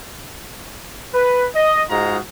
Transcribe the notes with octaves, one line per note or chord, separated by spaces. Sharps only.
B4
D#5
G#2 G#3 D#4 F4 F#4 A#5